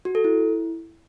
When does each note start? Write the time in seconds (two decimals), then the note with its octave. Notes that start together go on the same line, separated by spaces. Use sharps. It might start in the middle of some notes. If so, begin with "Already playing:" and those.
0.05 F#4
0.15 A4
0.24 E4